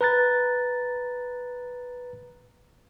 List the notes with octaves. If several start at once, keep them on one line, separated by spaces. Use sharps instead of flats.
B4 A#5 F#6 A6